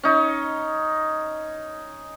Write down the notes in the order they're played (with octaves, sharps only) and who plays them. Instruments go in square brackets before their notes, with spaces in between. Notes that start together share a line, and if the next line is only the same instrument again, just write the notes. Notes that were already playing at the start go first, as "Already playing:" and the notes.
[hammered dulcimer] C#4 D#4